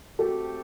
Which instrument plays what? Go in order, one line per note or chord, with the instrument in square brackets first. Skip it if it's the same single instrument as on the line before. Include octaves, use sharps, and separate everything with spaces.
[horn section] A3 C4 G4 [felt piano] F#4 A4